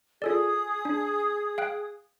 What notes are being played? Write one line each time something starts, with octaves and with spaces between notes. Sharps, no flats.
F4 G#4 A4 D5 D#6
D4
F5 G5 F#6